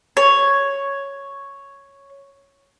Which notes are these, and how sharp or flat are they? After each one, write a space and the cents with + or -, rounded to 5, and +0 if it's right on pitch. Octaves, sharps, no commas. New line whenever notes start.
C#5 +0